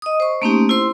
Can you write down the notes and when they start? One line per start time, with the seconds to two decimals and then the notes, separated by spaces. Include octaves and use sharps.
0.02 D#5 D#6
0.20 C5 C#6
0.42 A3 A#3 C4 C#4 D#4 G4
0.69 E4 C5 C6